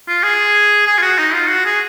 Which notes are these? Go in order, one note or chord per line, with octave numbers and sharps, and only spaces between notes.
F4
G#4
G#4
F4
F#4
D#4
F4
F#4
G#4